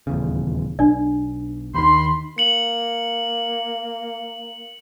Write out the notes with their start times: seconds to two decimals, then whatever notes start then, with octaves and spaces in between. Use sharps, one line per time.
0.07 D#1 E2 C#3
0.79 B1 D4 D5
1.74 D#2 D#3 B5 C6
2.38 A#3 C#7 F#7